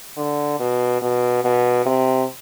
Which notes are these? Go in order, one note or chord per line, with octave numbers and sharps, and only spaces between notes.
D3
B2
B2
B2
C3